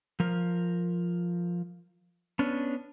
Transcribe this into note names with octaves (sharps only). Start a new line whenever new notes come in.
F3 A#4
B3 C#4 D4